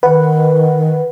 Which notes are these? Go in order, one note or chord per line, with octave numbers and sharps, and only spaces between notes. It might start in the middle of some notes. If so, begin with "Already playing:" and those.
D#3 B4 F#5